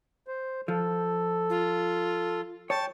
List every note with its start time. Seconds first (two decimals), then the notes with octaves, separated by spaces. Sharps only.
0.28 C5
0.68 F3 A4
1.50 F4
2.70 C#5 G5 A5 C#6